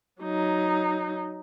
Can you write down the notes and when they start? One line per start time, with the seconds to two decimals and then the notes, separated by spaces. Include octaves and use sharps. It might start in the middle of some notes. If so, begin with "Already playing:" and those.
0.22 F#3 D#4